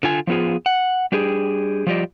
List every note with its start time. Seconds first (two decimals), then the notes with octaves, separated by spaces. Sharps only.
0.03 D3 F4 G#5
0.27 F3 F#3 B3 F4 G#4
0.66 F#5
1.12 G3 D4 G4 G#4
1.87 F3 G3 F4 G4 D5 D#5